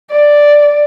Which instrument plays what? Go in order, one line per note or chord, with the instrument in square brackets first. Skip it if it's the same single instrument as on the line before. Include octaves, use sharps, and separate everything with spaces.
[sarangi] D5